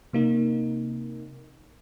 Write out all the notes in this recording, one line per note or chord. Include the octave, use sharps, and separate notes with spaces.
C3 A#3 D#4